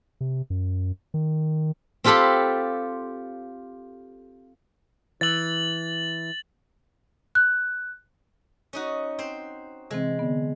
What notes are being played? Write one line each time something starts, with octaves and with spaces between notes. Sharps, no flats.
C3
F#2
D#3
C4 F4 G4 A4 B5 C6
E3 A6 F#7
F#6
C#4 D#4 F#4
C4 C5
C3 E3 G#3 C4
D3 B3